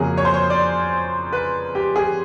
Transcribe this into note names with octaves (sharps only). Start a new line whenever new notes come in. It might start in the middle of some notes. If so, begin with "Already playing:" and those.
Already playing: F2 C#3 F#3 A#3 G#4
C#5
C5
C#5
D5
B4
G4
G#4